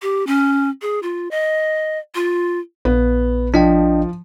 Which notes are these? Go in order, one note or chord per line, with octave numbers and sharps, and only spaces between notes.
G4
C#4
G#4
F4
D#5
F4
A#1 B3
F3 D4 D#5 G5